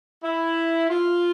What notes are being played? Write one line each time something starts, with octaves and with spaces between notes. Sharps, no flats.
E4
F4